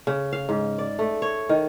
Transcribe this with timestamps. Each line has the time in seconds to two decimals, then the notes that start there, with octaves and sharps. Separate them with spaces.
0.07 C#3
0.32 F5
0.49 G#2
0.78 D5
0.99 A3
1.22 C#5
1.49 D#3